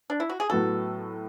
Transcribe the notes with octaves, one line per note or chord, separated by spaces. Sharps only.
D4
E4
F#4
G#4
A2 F#3 B3 F#4 A4